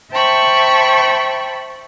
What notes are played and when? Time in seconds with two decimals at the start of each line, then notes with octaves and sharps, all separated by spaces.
0.12 C5 E5 G5 A5 B5 C#6